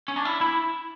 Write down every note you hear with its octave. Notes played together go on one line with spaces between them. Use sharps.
C#4
D4
E4
E4